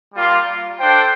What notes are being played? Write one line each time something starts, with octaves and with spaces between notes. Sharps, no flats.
G3 A#3 F4
D4 A4 C5 G5